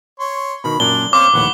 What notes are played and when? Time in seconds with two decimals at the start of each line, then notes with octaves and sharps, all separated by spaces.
0.19 C#5 C6
0.64 B2 D#3 B5
0.80 F#2 A#2 D4 G7
1.13 C4 C5 C#5 F5 D6
1.34 A#1 D#2 A2 B4 F#5